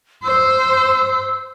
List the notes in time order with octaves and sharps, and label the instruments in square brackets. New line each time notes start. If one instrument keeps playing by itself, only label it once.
[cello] C5 [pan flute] E6